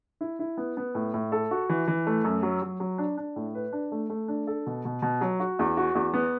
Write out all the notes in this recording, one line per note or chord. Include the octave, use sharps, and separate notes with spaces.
E4
E4
B3
B3
A2
A2
A4
F#4
E3
E3
A3
F#2
F#3
F#3
F#3
D4
D4
A2
B4
D4
A3
A3
D4
A4
B2
B2
B2
F#3
F#4
E2
F#4
E2
B3